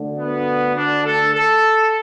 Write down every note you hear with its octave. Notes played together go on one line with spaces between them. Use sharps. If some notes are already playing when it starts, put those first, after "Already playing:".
Already playing: D2 D3
B3
D4
A4
A4